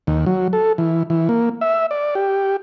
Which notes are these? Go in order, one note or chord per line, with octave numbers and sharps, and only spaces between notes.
D#2
F#3
A4
E3
E3
A#3
E5
D5
G4